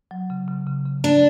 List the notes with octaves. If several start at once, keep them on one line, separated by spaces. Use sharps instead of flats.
F#3
C#3
C#3
C#3
C#3
A3 D4